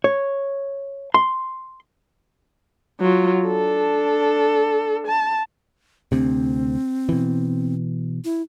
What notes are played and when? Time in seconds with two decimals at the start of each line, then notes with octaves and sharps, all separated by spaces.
0.04 C#5
1.14 C6
3.00 F#3 F4
3.46 D4 A4
5.07 A5
6.12 D2 C3 C4
7.09 B2 E3
8.24 E4